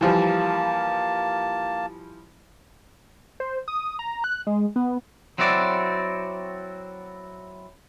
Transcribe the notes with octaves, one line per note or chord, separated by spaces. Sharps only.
E3 F3 G3 A#3 A5
C5
D#6
A#5
F#6
G#3
B3
F#3 C4 E4 F#4 D5